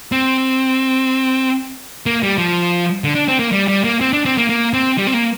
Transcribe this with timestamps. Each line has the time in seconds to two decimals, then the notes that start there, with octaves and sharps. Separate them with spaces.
0.12 C4
2.06 A#3
2.23 G3
2.38 F3
3.04 D3
3.15 D4
3.28 C4
3.39 A#3
3.52 G3
3.68 G3
3.84 A#3
4.01 C4
4.13 D4
4.25 C4
4.38 A#3
4.49 A#3
4.74 C4
4.98 G3
5.07 C4
5.14 A#3